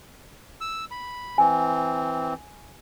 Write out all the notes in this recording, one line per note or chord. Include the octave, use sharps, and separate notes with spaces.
E6
B5
E3 C4 G#5